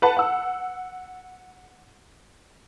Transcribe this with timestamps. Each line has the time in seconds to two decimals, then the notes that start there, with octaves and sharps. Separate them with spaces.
0.02 B4 F#5 A5 B5
0.17 F#5 E6